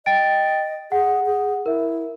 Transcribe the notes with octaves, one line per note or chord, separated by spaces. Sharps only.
D#5 G5 A6 D7
G#4 F#5
G#4
E4 A#4 E5